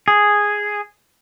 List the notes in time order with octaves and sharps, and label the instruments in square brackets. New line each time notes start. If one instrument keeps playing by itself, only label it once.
[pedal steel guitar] G#4